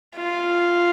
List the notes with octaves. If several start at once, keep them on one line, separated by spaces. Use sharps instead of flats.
F4